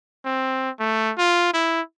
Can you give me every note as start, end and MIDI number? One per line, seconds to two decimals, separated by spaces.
0.25 0.70 60
0.79 1.12 57
1.18 1.49 65
1.54 1.81 64